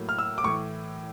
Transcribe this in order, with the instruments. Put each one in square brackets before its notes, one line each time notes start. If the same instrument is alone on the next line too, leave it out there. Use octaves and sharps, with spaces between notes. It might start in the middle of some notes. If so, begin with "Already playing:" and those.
Already playing: [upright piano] A2 F#3 A#3
[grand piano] F6
E6
D6
[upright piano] A2 E3 [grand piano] C#6